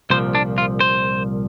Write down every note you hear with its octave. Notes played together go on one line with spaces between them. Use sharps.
C2 A#2 F3 C5
D4
F4
C5